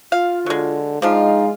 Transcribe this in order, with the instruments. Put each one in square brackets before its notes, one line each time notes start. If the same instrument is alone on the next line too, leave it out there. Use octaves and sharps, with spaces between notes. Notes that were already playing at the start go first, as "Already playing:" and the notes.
[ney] F4 [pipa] F5
[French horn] D3 [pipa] F#3 G#3
[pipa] F3 D4 F4 [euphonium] G#3 [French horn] D#4 [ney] F5